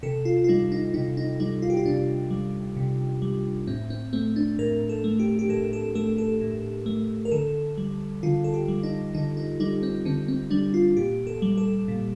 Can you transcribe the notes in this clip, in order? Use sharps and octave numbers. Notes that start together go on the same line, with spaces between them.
C3 A4
F4
F4
G3 D#4
D#4
C3 D#4
D#4
G3 D#4
F4
G4
F4
C3 D4
G3
C3
G3
A2 C4
C4
A3 C4
D4
A2 A#4
A4
A3
G4
G4
A2 A4
A4
A3 A4
A4
A2
A3
A#4
D3 A4
G3
D3 F4
A4
G4
G3
D#4
D3 D#4
D#4
G3 D#4
C4
D3 C4
C4
G3 D4
F4
A#2 G4
A4
G3
A4
A#2